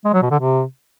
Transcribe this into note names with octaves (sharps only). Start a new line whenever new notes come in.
G#3
F#3
B2
D3
C3